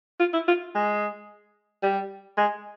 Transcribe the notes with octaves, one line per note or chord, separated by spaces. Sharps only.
F4
E4
F4
G#3
G3
G#3